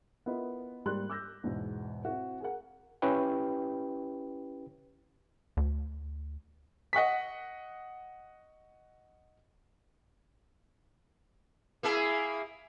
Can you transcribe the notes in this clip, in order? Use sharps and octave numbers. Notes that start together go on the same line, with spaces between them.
B3 E4 F4 A#4 B4 D#5
G#2 G3 A#3 C6 F#6
D6 E6 G6 A#6
E2 G#2 B2
C4 E4 F#4
G#4 A#4 F#5
C#4 E4 G4 B4 G5
D2
D#5 F#5 C#6 B6
A#3 E4 G#4